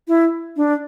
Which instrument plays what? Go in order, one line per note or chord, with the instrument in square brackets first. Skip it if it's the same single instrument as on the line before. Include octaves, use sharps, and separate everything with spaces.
[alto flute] E4
D4